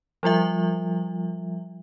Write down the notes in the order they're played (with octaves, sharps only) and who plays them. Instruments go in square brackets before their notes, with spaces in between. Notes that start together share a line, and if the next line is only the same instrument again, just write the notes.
[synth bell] F3 G3 F4 E5